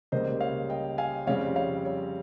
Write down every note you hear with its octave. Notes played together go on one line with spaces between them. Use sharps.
C#2 C#3 G3 A#3 C5 D#5
C#5 F5
D#5 G5
F5 G#5
F2 C#3 G3 C4 C#5 F5
C#5 F5
C#5